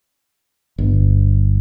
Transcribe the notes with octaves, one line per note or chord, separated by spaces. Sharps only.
G1